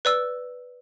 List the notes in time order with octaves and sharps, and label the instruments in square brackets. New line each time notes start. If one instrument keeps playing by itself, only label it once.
[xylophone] B4 D5 E6